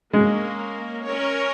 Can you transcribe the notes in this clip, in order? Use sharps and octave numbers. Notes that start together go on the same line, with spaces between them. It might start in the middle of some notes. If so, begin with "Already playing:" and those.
G#3 A#3 C#4 A#4
C#4 A#4 C#5